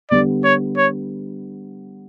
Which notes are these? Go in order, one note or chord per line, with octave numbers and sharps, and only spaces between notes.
D3 G3 B3 D5
C#5
C#5